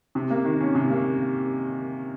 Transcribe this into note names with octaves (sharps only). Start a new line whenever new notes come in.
C3
A#3
D#3
C#4
C3
A#3